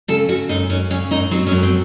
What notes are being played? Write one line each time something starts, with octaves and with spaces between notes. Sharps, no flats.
C#3 A4
C#3 F#4
F#2 D#4
F#2 C#4
C#3 C#4
F#2 D#4
F#3 C4
C#4
F#2
C4